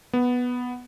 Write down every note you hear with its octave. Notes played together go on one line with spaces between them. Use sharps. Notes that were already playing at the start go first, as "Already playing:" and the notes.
B3